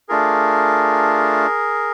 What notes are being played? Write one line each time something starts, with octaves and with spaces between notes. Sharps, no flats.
A3 D4 F4 G#4 A#4